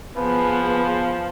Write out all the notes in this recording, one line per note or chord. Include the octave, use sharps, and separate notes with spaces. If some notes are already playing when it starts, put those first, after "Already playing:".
F3 B3 G#4 B4